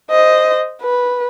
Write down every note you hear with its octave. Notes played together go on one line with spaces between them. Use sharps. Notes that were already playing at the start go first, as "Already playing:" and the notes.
C5 D#5
B4